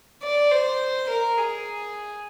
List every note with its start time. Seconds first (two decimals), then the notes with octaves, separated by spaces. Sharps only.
0.22 D5
0.51 C5
1.09 A#4
1.38 G#4